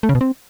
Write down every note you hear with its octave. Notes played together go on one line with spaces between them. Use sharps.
A3
C#3
B2
C4